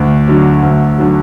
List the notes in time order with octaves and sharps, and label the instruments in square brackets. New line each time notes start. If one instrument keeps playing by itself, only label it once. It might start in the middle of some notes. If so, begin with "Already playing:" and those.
Already playing: [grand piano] D2
D3 F#3
D2
D3 F#3